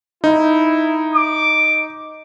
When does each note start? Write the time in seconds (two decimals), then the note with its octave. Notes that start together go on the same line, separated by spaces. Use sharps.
0.24 D#4 E4
1.14 D6